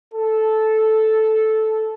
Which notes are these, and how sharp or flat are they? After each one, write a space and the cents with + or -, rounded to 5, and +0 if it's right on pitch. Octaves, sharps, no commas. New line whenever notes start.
A4 -10